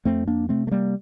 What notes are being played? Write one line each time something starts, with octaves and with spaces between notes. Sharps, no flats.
F2 A3 C4
A#3 D4
C3 A3 C4
A3
G3 A#3